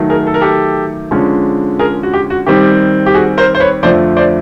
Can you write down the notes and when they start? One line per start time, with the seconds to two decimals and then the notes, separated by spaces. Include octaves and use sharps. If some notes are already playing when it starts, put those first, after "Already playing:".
Already playing: D#3 F#3 A3
0.10 G#4 A#4
0.27 A4
0.34 A#4
0.41 G4 A4
1.11 D3 F3 G#3 C#4
1.79 G#4 A#4
2.03 F#4
2.13 G4
2.30 F#4
2.46 D#3 G3 C4 G4
3.06 G4
3.14 F#4 G#4
3.37 A#4 C5
3.55 C5
3.60 B4 C#5
3.83 F2 D3 F3 A3 C5 D5
4.17 C5 D5